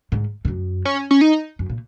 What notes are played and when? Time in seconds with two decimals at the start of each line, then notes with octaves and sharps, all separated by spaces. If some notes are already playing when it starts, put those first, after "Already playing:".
0.12 G#2
0.45 G#2
0.48 F#2
0.85 C#4
1.11 C#4
1.21 D#4
1.59 F#2
1.69 A#2